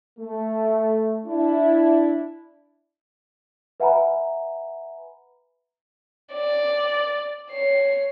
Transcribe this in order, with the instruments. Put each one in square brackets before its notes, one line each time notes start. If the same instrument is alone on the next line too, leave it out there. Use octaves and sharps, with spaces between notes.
[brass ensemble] A3
D4 E4
[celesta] B4 E5 F#5 G#5 A#5 B5
[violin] D5
C#5 C7